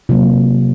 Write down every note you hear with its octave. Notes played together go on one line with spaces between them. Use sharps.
C3 F#3 A#3 F4